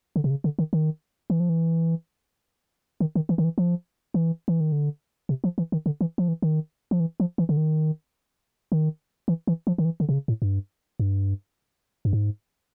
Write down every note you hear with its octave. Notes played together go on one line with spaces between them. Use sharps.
D3
C3
C#3
D3
D#3
D#3
E3
F3
E3
D#3
D#3
E3
D#3
E3
F3
E3
E3
D#3
D3
C3
F3
E3
D#3
D3
E3
F3
E3
D#3
F3
E3
F3
E3
D3
D#3
D#3
E3
E3
F3
D#3
E3
D3
C3
C#3
A2
G2
G2
G2
G#2